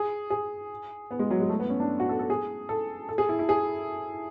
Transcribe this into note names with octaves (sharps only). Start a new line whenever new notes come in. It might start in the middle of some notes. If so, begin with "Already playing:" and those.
Already playing: G#4
G#4
B3
G#3
F#3
G#3
A3
B3
C#4
D4
F#4
A4
A4
G#4
A4
A4
G#4
E4
E4
G#4